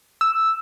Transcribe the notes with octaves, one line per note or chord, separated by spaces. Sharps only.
E6